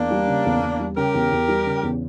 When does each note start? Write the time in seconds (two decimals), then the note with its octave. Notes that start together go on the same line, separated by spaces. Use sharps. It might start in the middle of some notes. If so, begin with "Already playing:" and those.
Already playing: E2 A#3 D4
0.11 G3
0.27 C#3
0.45 E2
0.62 E2
0.80 G3
0.96 C#3 G4 A#4
1.14 E2
1.31 E2
1.49 G3
1.66 C#3
1.83 E2